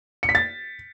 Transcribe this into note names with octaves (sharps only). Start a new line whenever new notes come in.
C#7
B6
A6